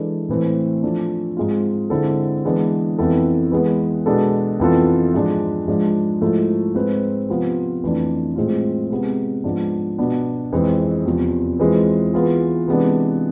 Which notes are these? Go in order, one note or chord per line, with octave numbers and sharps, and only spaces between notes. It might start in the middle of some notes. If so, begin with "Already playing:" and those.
Already playing: E3 G#3 D4 A4
A2 E3 A3 C4
F3 A3 D4
G#2 G#3 C4 F4
D3 G#3 C4 E4 A4
E3 G#3 B3 D4
F2 E3 B3 E4 A4
E3 G#3 B3
B2 G#3 B3 D4 A4
F2 E3 B3 F4 A4
G#2 F3 G#3 D4
G#2 F3 G#3 D4
G#2 F3 A3 E4 A4
G#2 G#3 C4 G#4 B4
C3 F3 B3 F4
F2 E3 A3 D4
A2 G#3 C4 F4
C3 G#3 B3
G#2 F3 B3 D4
B2 B3 D4
F2 E3 G#3 C4 G#4
E2 C3 F3
E3 G#3 C4 F4
E3 B3 F4 G#4
C3 E3 G#3 B3 D4